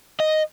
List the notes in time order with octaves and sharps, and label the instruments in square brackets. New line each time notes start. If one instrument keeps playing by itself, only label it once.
[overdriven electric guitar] D#5